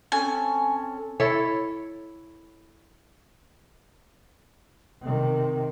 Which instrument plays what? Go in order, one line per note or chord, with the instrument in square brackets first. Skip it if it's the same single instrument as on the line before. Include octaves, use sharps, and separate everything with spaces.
[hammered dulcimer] C4 C#4 A4 [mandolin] G#5
[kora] E4 A4 C#5
[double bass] C3 D#3